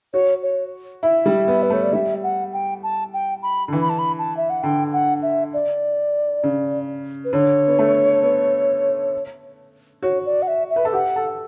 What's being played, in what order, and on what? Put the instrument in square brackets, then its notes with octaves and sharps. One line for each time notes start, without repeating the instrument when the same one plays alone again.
[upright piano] F#4 [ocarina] C#5
[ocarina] C#5
[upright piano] E4 [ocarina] E5
[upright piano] G3
B3
[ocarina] B4
[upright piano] A3
[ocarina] C#5
D5
[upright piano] G3 [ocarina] E5
[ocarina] F#5
G5
A5
G5
B5
[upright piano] D3
E3
[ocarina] B5
A5
B5
A5
E5
F#5
[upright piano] D3 [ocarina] G5
[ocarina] F#5
E5
D5
[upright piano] C#3
[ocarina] B4
[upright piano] D3 [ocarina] C#5
[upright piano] B3
A3
B3
[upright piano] F#4 [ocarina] C#5
[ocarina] D5
F#5
E5
E5
[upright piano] B4
A4
[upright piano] G4 [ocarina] F#5
[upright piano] A4